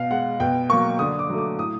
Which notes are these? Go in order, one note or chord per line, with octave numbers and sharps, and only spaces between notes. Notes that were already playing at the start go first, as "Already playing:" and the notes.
Already playing: B2 F5
G#3 F#5
B2 G5
F#3 A#3 C#6
D3 D#6
D6
F#3 A3
D6
A2 D#6